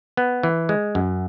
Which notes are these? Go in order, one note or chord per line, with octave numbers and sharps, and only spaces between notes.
B3
E3
G#3
F#2